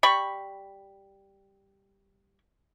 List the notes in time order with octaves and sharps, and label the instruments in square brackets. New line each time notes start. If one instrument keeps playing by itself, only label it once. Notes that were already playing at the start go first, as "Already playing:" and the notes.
[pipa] G3 B5 C#6